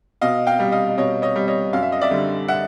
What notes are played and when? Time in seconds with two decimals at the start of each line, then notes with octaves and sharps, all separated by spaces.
0.21 B2 D#5 F5
0.47 F5 G5
0.60 G3
0.72 D#5 F5
0.98 B2 C#5 D#5
1.22 C#5 D#5
1.36 G3
1.48 C#5 D#5
1.73 F#2 F5
1.83 E5
1.92 D#5
2.01 D5 E5
2.11 D3 G3
2.48 E5 F#5